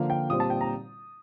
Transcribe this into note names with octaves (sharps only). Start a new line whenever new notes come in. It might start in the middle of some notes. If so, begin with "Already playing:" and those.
Already playing: D3 F3 A#3 F5
G5
A#2 G3 C4 D#6
A5
G5
A#5